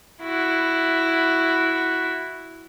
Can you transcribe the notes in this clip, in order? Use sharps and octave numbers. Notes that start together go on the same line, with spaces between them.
E4 F#4